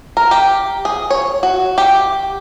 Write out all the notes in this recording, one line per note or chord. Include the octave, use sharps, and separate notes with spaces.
A#4
G4
G#4
C#5
F#4
G4